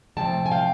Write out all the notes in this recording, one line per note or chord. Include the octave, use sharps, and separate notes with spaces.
D2 C3 F3 A3 G5 A5
G#5
F5 G5